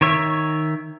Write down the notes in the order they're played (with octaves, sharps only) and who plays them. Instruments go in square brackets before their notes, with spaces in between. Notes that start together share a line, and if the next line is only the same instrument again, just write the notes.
[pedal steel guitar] D#3 C#5 E5